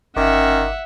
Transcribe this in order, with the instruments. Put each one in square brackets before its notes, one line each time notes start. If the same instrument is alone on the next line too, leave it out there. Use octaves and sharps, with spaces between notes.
[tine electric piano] G1 D6 [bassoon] D#3 [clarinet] C#4 [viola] E5 F#5